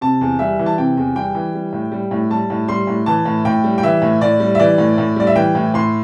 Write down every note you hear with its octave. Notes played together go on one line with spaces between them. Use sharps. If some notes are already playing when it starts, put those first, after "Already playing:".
C3 A5
E2
G3 E5
E3
A5
C3 G5
E2
G3 G5
E3
G3
A2
G3
A2
G3 A5
A2
G3 C6
A2
E3 A5
A2
A2 G5
G3
G5
E3 E5
A2
A2 D5
G3
E5
E3 D5
A2
A2
G3 D5
E5
E3 G5
A2
A2 C6